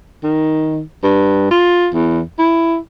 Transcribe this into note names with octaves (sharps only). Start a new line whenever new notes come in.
D#3
G2
F4
E2
E4